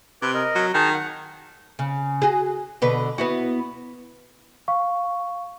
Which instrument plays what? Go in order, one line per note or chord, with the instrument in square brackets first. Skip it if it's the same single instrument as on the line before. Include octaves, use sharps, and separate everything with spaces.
[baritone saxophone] C3 [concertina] B4 D6
[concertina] A#4 D#5
[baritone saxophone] F#3
[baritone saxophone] D#3 [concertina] G#4 A5 A#5
[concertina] F#5
[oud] C#3
F#4 G#4
B2 D3 B4
B3 E4 F#4
[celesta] F5 C#6